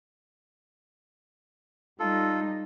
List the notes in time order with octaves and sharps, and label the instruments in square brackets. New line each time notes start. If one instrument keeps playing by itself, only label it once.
[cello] G3 D#4 [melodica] F4 A4